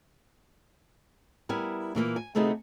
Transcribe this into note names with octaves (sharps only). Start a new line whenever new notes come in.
G3 B3 E4 A#4 G#5
A#2 E3 G#3 A#3
G#5
D2 C3 A3 B3 D#4 G#4